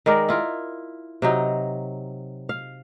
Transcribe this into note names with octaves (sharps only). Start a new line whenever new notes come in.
D#3 G#3 A#4 D5
E4 F4 A#4
C3 F#3 D#4
F5